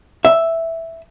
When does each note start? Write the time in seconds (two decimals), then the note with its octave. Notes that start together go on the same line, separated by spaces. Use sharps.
0.25 E5